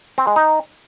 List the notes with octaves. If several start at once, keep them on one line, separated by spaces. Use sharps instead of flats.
C4
G#3
D#4